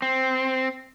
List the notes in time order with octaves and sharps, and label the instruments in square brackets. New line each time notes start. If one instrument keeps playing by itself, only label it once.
[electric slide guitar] C4